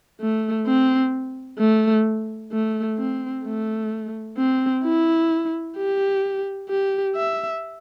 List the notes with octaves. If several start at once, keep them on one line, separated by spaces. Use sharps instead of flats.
A3
C4
A3
A3
C4
A3
C4
E4
G4
G4
E5